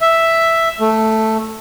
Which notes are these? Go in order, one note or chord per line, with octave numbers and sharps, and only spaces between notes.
E5
A3